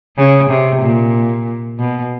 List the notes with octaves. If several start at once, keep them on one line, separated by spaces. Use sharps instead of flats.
C#3
C3
A#2
B2